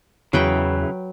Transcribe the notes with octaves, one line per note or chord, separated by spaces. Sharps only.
E2 C#3 E3 F#3 B4 G5